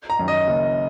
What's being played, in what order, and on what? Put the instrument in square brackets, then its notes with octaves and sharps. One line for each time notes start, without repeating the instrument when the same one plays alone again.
[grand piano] A#5
F#2 D#3
D#5
F#1